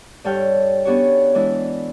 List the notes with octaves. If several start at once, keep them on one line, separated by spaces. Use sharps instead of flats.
G2 G3 A4 C#5 G5 F6
B3 C#4 D4 F#4 G4 C#5
E3 G#3 D4 E4